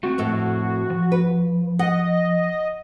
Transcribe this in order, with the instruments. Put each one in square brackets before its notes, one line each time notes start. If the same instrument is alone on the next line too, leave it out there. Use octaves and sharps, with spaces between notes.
[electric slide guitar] A3 C4 [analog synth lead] F#4
[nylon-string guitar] F2 A2 [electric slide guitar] A4 A#4
[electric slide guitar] F3
[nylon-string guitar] B4
[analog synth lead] D#5 [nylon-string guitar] F#5